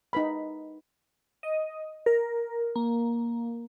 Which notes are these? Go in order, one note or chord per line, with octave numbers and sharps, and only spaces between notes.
D#4 B4 B5
D#5
A#4
A#3